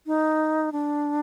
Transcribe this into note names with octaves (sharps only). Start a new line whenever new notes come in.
D#4
D4